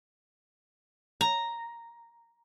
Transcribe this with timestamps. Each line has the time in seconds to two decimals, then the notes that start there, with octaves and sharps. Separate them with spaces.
1.21 A#5